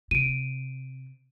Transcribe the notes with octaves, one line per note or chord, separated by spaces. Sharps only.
C3 D7 D#7